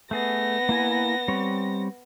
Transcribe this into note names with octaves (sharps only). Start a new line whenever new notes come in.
A3 B3 G#4 A#6
A#3 E4 G#5
G3 C4 C#5